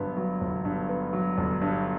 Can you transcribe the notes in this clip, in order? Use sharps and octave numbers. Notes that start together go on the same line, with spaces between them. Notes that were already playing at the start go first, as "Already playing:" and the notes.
Already playing: G1 G2 F#3 B3
F#3
G1
G2
B3
F#3
G1
G2